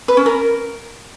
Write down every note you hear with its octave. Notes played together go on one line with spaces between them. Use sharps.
B4
C#4
A#4